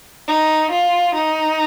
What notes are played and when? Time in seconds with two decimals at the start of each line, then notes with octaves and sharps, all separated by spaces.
0.28 D#4
0.72 F4
1.14 D#4